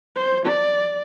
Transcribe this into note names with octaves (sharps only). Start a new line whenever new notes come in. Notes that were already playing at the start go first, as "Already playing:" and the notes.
C5
D5